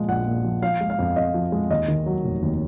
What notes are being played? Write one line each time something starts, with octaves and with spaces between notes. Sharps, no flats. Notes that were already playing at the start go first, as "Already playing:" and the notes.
Already playing: A#2 F3 G#3
A#1 F#5
A#2
F3
F3 F5
G#3
F5
F2
F2 D#5
F3
G#3
D#2 D#5
D#3
F#3
F1
D#2